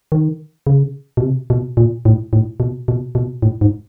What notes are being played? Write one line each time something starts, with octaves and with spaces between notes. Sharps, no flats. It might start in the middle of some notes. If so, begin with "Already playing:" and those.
D#3
C#3
B2
C3
B2
A#2
A2
A2
B2
B2
B2
A2
G#2